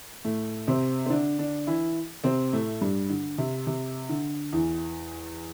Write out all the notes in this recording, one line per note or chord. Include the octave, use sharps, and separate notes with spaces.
A2 A3
C3 C4
C4
D3 D4
D3 D4
E3 E4
C3 C4
A2 A3
G2 G3
D3
C3
C3
D3
E2 E3